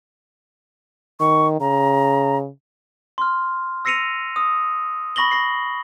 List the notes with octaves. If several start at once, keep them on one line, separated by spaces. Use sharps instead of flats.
D#3 C#6
C#3 A#5
C6 F6
E6 A#6 C7 C#7 D#7 F7
D#6
B5 C#6 A#6 F#7 G7
A#6 C7